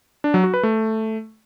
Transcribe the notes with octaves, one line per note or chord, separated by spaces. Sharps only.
D4
F#3
F#4
B4
A3